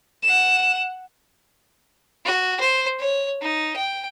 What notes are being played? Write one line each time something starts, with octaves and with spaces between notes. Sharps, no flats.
F#5 E7
F#4
C5
C#5
D#4
G5